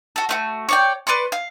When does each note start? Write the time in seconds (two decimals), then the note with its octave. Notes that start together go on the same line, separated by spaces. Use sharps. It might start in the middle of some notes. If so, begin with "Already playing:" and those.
0.16 F#4 A4
0.29 A3 F4 F#4
0.69 C#5 D5 G5
1.07 B4 D5 C6 C#6
1.32 F5